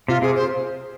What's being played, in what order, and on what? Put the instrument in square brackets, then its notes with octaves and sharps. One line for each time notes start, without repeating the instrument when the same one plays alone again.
[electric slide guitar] C3 [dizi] F4
[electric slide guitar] C3 [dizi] G#4
[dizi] C5